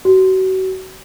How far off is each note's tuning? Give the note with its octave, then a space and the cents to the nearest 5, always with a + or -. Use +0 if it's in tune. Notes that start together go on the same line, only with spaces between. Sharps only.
F#4 +35